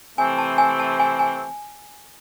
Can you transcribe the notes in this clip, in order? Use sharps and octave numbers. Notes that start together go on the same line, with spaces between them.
C3 E3 A3 C4 G#5
A5
G#5
A5
G#5
G#5